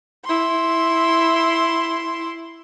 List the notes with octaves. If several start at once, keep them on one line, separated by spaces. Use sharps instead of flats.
E4 C6